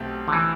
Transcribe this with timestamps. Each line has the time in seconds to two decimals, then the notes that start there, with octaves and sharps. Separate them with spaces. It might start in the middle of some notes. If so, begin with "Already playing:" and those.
Already playing: B1 B2 A3 C4 G4
0.28 D3
0.33 E3